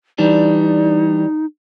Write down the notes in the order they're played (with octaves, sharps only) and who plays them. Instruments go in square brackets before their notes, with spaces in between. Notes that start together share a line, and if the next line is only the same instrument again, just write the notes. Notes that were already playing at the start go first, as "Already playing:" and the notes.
[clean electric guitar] E3 G3 D4 [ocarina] D#4